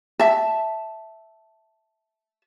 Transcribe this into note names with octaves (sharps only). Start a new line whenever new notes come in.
E5 A5